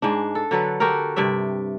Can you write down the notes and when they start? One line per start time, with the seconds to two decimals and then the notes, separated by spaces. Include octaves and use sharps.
0.02 G#2 G#3 D4
0.35 A4
0.51 D3 F#3 A4 B4
0.80 F#4 G4 A4 A#4
1.16 G2 C3 D5 E5